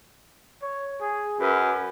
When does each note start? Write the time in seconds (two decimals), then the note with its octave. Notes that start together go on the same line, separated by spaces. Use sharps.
0.62 C#5
1.01 G#4
1.40 F#2 B4